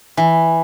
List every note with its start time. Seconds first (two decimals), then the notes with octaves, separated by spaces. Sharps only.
0.17 E3